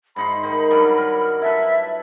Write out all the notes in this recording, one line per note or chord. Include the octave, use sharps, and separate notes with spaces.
G#2 D#4 B5 C6
D#3 D#4
G2 F#3 G3
A#4
E4 A4 B4 E5